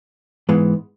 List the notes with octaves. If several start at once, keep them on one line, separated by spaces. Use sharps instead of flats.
G#2 E3 G#3 B3